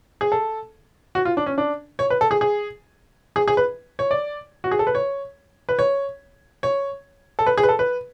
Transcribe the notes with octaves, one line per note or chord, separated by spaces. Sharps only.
G#4
A4
F#4
F4
D4
C#4
D4
C#5
B4
A4
G#4
G#4
G#4
G#4
B4
C#5
D5
F#4
G#4
A4
B4
C#5
B4
C#5
C#5
A4
B4
G#4
B4
A4
B4